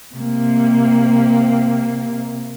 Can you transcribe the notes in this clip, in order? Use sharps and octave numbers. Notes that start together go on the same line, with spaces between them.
C3 A#3